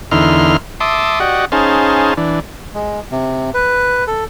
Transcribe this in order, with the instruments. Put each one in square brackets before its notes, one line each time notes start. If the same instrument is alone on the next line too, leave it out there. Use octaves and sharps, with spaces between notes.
[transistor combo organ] E2 D3 D#4 E4 C6 F6
E5 A5 C6 D6 D#6
F#4 G4 D5 D#5 F#5
C#4 D#4 G#4 C5 F5 A5
E3 D4
[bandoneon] G#3
C3
B4
A4